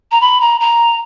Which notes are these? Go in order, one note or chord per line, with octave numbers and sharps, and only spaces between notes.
A#5
B5
A#5
A#5